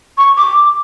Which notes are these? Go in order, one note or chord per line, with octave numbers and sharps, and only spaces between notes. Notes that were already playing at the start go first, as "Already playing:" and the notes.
C#6
D6